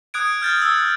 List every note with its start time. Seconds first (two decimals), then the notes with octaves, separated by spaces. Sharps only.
0.14 D#6 F#6 G#6 D7
0.42 F6 G6 A6
0.62 E6